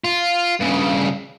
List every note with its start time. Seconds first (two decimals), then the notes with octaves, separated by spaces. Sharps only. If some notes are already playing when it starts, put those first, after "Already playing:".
0.04 F4
0.60 G2 C#3